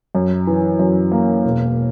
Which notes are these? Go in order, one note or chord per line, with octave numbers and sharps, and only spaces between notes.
F#2
E3
F#2
A#3
E1